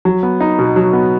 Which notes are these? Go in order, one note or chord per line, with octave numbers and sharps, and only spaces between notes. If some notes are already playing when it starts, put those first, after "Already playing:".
F#3
B3
D#4
B2
F#3
B3